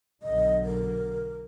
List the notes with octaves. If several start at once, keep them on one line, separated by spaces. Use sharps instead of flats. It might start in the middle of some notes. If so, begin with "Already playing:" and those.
B1 D3 D#5
A#4